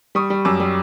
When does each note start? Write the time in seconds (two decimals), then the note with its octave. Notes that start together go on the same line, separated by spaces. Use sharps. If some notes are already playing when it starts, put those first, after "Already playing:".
0.15 G3 C#6 D#6
0.30 G3
0.45 F#2 D6 E6
0.60 G3